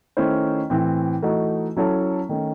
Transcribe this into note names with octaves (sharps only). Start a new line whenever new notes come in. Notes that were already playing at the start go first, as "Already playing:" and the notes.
D#3 A3 C#4 E4 C5
A2 E3 C4
E3 A3 D#4 F#4
F#3 C#4 E4 A4 C#5
D#3 A3 C#4